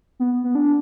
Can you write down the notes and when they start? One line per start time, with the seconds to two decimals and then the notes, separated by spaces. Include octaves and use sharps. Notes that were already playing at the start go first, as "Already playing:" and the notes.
0.20 B3
0.44 B3
0.55 D4